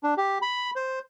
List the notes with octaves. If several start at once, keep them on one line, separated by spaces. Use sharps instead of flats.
D4
G4
B5
C5